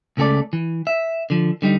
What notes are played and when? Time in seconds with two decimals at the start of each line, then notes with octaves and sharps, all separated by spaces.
0.17 C#2 C#3 A3 F#4 A4 D5
0.53 E3
0.87 E5
1.30 D3 F3
1.62 D3 G3 D#4